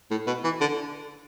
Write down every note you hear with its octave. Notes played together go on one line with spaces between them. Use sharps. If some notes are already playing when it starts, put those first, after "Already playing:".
A2
B2
E3
D3